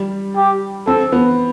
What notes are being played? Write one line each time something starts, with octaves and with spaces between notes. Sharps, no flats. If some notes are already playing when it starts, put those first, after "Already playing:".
Already playing: G3
G4
C4 A4
B3